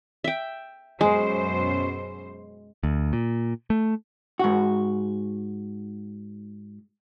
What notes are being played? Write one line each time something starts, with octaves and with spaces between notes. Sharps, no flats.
E5 G5
F#2 B2 G#3 C5
D2
A#2
A3
G#2 F#4